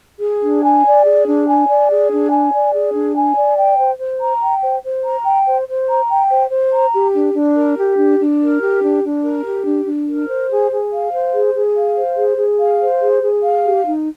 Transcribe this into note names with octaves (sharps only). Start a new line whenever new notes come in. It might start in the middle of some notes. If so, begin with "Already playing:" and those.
G#4
D4
G#5
D5
G#4
D4
G#5
D5
G#4
D4
G#5
D5
G#4
D4
G#5
D5
G5
C5
C5
A#5
G5
C5
C5
A#5
G5
C5
C5
A#5
G5
C5
C5
A#5
G4
D4
D4
A#4
G4
D4
D4
A#4
G4
D4
D4
A#4
G4
D4
D4
A#4
C5
G#4
G#4
F5
C5
G#4
G#4
F5
C5
G#4
G#4
F5
C5
G#4
G#4
F5
G4
D#4